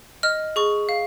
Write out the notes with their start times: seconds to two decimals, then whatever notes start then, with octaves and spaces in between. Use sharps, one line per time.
0.23 D#5 F6
0.56 G#4 C#6
0.89 F5